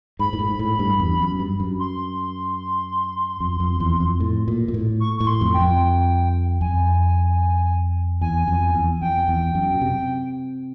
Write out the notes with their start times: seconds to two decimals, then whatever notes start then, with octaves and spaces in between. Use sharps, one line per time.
0.19 G#2 B5
0.33 A2
0.39 G#2
0.59 A2
0.79 G2
1.00 E2
1.19 F#2
1.39 G2
1.60 F#2
1.80 C6
3.40 F2
3.60 F2
3.80 E2
4.00 F2
4.20 A2
4.48 A#2
4.68 A#2
4.74 A2
5.00 C#6
5.17 C#6
5.21 A2
5.27 C6
5.41 F2
5.54 G5
5.61 F2
6.61 F2 G#5
8.21 E2 G#5
8.48 F2
8.75 E2
9.01 F2 G5
9.28 E2
9.55 F#2
9.75 B2
9.81 C3